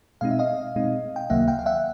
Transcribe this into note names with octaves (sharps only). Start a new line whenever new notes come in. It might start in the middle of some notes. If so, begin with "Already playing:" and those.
B2 G#3 C4 D#4 F5
E5
D#5 F5
B2 G#3 C4 D#4
G5
C#2 C3 D#3 F#3 A#3 E5 F#5
F5 G5
F5
E5 F#5